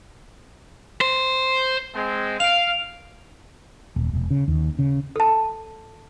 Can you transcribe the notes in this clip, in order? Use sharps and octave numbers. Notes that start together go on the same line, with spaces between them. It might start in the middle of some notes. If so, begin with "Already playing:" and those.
C5
G#3 C4
F5 D7 F7
D#1
E1
C#3
D#2
C#3
A4 A5